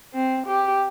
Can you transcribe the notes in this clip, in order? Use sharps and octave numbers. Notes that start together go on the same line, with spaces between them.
C4
G4